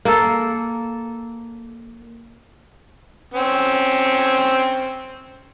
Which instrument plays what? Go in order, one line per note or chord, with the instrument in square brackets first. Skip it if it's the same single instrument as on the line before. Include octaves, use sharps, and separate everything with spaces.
[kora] A#3 A4
[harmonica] C4 C#4